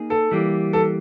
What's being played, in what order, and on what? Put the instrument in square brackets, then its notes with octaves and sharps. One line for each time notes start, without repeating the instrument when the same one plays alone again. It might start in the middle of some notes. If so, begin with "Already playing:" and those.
Already playing: [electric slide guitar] A#3 D#4 G#4
[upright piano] A4
[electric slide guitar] E3 G3 A#3
[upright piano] A4